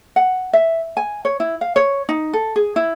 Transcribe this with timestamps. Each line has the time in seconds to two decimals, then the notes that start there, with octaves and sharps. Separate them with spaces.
0.16 F#5
0.53 E5
0.97 G#5
1.25 C#5
1.40 E4
1.61 F5
1.76 C#5
2.09 D#4
2.33 A4
2.56 G#4
2.76 E4